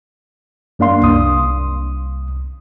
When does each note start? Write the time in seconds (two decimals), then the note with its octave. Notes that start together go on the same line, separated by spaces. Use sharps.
0.79 F#2 A#3 D4 F5 C6
1.02 C2 D#6